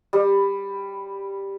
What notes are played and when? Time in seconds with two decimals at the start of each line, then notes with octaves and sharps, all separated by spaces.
0.13 G3